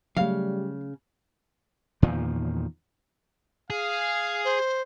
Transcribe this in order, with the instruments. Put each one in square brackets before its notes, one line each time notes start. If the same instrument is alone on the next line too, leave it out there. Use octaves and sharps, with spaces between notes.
[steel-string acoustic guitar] C#3 [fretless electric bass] F#3 A3 [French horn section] G3 [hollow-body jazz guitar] F5
[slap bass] E2 A#2 D#3 F3
[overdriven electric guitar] G#4 [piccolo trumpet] F5
[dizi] C5